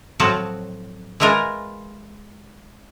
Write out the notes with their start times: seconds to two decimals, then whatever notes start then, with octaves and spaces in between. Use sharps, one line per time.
0.20 A2 F3 F#3 C4 F#4 A5
1.20 E3 G#3 E4 F4 A#4